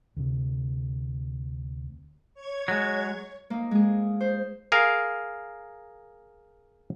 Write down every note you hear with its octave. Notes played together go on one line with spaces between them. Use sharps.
D2 C3
C#5 G#6
F#3 G#3
A#3 D#4
G#3 G#4
C5
G#4 A#4 F5